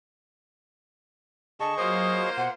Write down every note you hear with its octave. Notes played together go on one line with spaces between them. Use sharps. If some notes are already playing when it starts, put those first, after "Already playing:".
D3 G#4 D#5 A5 C#6
F#3 A#3 F4 C5 D#6
B2 F#5